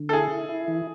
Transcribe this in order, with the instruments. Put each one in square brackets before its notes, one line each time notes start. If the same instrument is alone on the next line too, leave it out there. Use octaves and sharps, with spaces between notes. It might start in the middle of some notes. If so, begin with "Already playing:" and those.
Already playing: [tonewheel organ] D3
[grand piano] A4
[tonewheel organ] E4 [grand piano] G#4
[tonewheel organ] E4
E4
E3